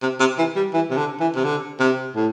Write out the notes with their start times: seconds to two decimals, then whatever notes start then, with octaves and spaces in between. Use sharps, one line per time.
0.03 C3
0.20 C3
0.38 E3
0.56 G3
0.74 E3
0.91 C3
0.97 D3
1.20 E3
1.36 C3
1.45 D3
1.80 C3
2.16 A2